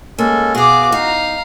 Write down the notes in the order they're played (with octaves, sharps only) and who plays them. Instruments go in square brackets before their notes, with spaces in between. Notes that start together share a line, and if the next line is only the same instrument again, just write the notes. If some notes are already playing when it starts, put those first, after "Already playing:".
[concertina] G#3 C#4 A4 [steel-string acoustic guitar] A#3
[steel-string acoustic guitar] B2 F5 [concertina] F#4 [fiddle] G#4 D6
[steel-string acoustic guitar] D#4 [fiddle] F5 A#5